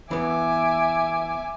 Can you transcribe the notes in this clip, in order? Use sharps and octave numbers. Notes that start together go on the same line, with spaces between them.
E3 B3 E5 G#5 D6